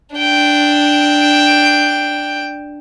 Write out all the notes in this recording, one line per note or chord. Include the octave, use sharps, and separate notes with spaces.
D4 G5